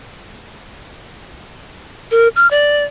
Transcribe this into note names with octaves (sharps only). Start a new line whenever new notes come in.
A#4
F6
D5